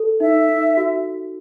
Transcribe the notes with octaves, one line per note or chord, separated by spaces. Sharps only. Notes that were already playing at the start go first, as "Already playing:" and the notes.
Already playing: A4
D#4 E5
D#4
F#4